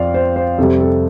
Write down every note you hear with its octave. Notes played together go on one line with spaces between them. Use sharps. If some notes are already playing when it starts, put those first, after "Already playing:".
Already playing: F2 F3 D5 F5
C5
C5
F2 C3 G3 A4
A4